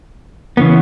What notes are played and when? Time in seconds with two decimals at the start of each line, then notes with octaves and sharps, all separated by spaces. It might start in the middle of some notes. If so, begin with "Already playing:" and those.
0.57 C#3 E3 B3